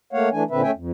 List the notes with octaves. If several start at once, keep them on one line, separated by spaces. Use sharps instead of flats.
A3 A#3 C#5 F5 F#5
E3 A3 D4 G#5
A#2 D3 C4 B4 E5
A3 C#4 E5 G5 G#5
F2